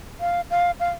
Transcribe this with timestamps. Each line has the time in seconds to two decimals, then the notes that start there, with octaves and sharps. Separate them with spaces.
0.20 F5
0.50 F5
0.80 F5